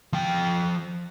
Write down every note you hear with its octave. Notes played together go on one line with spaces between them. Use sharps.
F3 G5